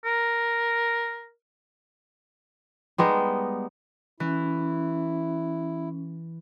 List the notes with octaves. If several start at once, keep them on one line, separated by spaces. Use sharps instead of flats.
A#4
G3 G#3 B3 D#4
E3 C#4 E4